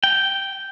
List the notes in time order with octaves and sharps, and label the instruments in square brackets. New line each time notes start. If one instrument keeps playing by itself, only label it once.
[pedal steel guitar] G5